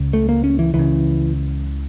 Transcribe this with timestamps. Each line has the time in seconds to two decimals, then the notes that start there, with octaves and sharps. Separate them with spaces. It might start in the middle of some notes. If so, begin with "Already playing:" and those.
Already playing: C#2 C#3
0.13 A3
0.29 A#3
0.44 C#4
0.59 E3
0.74 C#2 C#3 E3